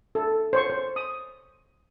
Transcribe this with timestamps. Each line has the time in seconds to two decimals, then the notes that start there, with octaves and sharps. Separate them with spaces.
0.15 A4
0.53 C5 C#5 C#6
0.70 C5
0.96 D#6